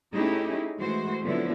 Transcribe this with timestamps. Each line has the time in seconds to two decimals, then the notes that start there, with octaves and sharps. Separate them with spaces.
0.14 A3 C#4 D#4 E4 G4 G#4
0.78 E3 G#3 A3 F#4 C5
1.22 D3 F3 F#3 B3 C4 E4